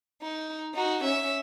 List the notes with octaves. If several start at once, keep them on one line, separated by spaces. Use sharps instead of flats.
D#4
D#4 F#4
C#4 E5